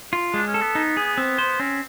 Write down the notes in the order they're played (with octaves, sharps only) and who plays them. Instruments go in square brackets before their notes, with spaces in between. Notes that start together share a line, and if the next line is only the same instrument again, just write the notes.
[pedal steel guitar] F4
[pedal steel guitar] G#3 [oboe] D4
[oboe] C#4
[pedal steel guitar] A4
[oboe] B3
[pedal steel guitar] D#4
G#4
C4
C5
[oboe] C4 [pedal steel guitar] C#4